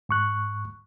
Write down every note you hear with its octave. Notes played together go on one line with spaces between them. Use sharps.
G#2 C#6 F#6